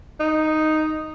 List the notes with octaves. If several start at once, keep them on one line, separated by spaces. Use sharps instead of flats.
D#4